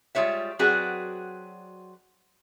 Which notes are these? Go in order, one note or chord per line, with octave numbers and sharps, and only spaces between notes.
G3 G#3 F4 C#5 E5
F#3 C4 F#4 G#4 B4 D5